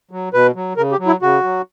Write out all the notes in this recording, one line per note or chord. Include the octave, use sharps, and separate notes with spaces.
F#3
B2 B4
F#3
C#3 A#4
G4
F#3
E4
C#3 F#4
F#3